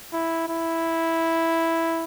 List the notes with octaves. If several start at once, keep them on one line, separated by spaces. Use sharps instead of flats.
E4
E4